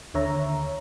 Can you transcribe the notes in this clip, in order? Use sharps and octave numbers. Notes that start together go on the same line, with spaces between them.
D#2 D3 C#5 E5 A#5